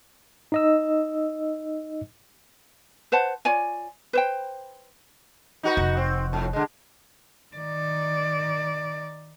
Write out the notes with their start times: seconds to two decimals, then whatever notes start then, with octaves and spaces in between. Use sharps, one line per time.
0.52 D#4 D#5 E6
3.12 B4 C5 F#5 A5
3.45 F4 C#5 D5 G#5
4.13 B4 C5 G5
5.63 D#4 F#4 B4
5.77 F1
5.97 C4
6.33 F2 A2
6.53 D3 G#3
7.55 D#3 D5